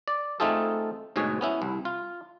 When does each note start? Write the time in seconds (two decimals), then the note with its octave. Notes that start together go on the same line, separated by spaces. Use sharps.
0.08 D5
0.40 A3 C4 D#4 F4 G#4 A4
1.16 D2 G#2 B2 G#4 C#5
1.41 B3 C#4 E4
1.62 C2
1.85 F4